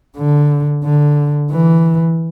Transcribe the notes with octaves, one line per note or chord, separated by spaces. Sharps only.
D3
D3
E3